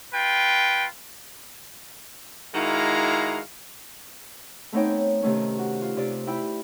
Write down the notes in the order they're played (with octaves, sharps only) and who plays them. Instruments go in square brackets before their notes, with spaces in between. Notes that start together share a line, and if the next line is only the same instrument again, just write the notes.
[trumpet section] F4 B4 G5
[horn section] D#3 G#3 E4 F#4 F5 A#5
[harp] A3 B3 C4 D#4 C#5 G5
C3 D#3 A3 C#4
F#4
F4
C3 D5
E4 G5 B5